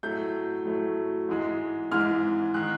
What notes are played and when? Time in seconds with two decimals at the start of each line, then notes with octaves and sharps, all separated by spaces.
0.03 A2 F#3 A3 G6
0.65 A2 F#3 A3
1.29 G#2 E3 G#3
1.91 G#2 E3 G#3 F6
2.54 D#3 G#3 F#6